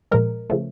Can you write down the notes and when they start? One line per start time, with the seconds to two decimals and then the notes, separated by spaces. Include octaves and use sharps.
0.11 A#2 F3 G#3 A#4
0.50 C#3 F3 A3